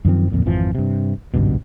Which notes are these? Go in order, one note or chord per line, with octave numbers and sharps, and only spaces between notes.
F#2 D#3 F3 C4
D1 F2 A#2
G#1 F2 E3 F3
G2 C3
G#1 C#2 G2 B2